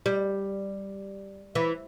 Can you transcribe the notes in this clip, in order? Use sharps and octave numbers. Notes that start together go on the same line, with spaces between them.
G3
E3